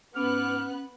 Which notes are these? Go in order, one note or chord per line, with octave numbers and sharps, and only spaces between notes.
G#2 B3 C#4 D6 F6 F#6